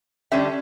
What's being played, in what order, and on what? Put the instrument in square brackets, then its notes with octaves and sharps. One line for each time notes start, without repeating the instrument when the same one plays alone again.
[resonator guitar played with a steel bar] D3 G3 C#4 E5